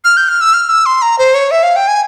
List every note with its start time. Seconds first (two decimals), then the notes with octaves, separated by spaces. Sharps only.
0.05 F6
0.17 G6
0.29 F6
0.41 E6
0.54 F6
0.69 E6
0.86 C6
1.02 A#5
1.19 C5
1.34 C#5
1.51 E5
1.63 F5
1.76 G5
1.88 G#5